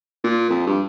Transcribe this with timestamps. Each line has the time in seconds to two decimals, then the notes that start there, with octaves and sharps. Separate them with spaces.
0.24 A#2
0.50 F2
0.66 G2